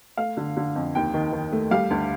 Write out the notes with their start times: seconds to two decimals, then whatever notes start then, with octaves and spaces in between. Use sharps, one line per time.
0.17 A3 F5
0.37 D3
0.57 D3
0.75 F2
0.95 D#2 G5
1.14 D#3
1.32 D#3
1.52 A3
1.71 G3 F5
1.91 D2